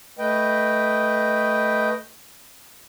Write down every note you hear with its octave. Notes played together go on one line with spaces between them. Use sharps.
A3 B4 D#5 G5